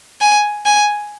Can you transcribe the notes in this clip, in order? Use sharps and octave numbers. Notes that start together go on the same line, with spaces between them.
G#5
G#5